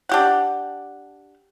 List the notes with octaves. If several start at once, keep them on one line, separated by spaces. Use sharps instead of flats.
D4 G4 F#5